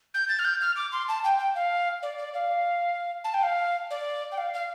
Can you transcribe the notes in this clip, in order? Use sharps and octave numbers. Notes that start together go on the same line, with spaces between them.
G6
A6
F6
G6
F6
D6
C6
A5
G5
G5
F5
D5
D5
F5
A5
G5
F5
D5
G5
F5
F5